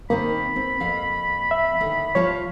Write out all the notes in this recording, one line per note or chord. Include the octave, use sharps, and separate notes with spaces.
D#3 A#3 C4 D#4 B5
C4
F2 F5
E5
D#2 D3
F3 F4 C#5 A5